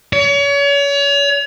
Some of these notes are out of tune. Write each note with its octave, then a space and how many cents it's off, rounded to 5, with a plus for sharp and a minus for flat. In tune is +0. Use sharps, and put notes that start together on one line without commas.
C#5 +35